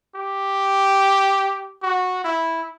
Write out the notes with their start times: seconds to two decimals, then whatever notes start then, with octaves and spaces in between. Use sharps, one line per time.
0.15 G4
1.82 F#4
2.24 E4